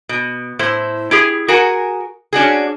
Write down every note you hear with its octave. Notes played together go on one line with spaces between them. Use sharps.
B2
A2 E4 C5
E4 G4 G#4
F#4 G#4 A#4 F#5 G#5
C#4 D4 F#4 G#4